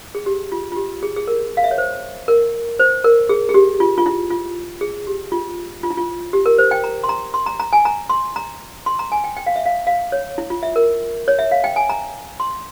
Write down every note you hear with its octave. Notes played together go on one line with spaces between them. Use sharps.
G#4
G4
F4
F4
G4
G#4
G#4
A#4
F5
E5
C#5
C5
A#4
C5
A#4
G#4
G#4
G4
F4
F4
E4
F4
G#4
G4
F4
F4
E4
F4
G4
A#4
C5
G5
A#5
C6
A#5
C6
A#5
A#5
G#5
A#5
C6
A#5
C6
A#5
G#5
G5
G5
F5
E5
F5
F5
C#5
E4
F4
E5
A#4
C#5
E5
F5
G5
G#5
A#5
C6